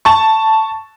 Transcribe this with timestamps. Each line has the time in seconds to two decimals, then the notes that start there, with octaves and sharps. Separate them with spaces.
0.05 A5 C#6